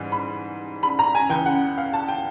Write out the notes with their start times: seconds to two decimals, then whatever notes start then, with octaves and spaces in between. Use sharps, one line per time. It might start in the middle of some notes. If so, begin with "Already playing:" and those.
Already playing: G#2 E3 G3
0.12 B5
0.83 B5
0.99 A#5
1.15 G#5
1.30 C#2 C#3 E3 G5
1.46 F#5
1.78 F5
1.93 A5
2.08 G5